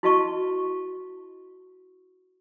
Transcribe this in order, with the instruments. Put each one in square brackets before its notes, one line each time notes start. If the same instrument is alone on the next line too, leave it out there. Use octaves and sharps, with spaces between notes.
[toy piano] E4 F#4 B4 D#5 A5 C#6